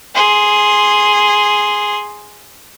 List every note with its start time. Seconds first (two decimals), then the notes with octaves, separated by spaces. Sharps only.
0.15 G#4 C6